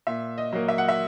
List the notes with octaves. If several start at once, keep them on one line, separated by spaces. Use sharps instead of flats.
A#2 E5
D#5
F#3 A#3
E5
F#5
E5